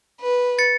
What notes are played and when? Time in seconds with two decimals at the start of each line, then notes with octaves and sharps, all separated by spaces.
0.21 B4
0.59 A6 C#7